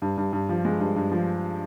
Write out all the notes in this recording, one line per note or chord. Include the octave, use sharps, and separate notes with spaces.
G2
G2
G2
F3
G#3
G2
G2
F3